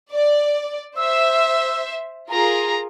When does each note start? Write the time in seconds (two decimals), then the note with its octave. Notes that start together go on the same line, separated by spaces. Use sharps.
0.11 D5
0.96 C5 E5 E6
2.30 F4 G#4 A#4 A#5